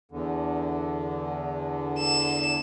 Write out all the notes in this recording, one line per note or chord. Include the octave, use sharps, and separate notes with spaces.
E2 D3
E7